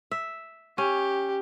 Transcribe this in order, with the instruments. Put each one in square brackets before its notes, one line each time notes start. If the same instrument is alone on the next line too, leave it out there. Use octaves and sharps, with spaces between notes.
[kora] E5
[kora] C#4 [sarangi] G4